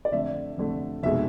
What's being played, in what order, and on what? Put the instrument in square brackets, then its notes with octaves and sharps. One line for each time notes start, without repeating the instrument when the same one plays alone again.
[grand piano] D5
F2 D3 A3 E5
F2 D3 A3
F1 B2 G#3 E5